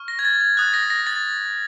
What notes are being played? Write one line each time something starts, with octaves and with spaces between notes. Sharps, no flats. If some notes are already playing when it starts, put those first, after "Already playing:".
Already playing: C#6 F6
A#6
G#6
A6
G#6
D#6 F#6 A6
A#6
A#6
A6